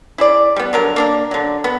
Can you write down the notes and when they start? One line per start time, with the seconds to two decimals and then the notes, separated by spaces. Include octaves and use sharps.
0.18 E4 G#4 D5
0.56 G3 B3
0.73 D3 F#3 A#4
0.96 A#3 D4 A#4
1.31 D3 F#3
1.64 B3